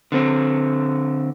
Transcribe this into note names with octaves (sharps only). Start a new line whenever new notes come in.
D3 C4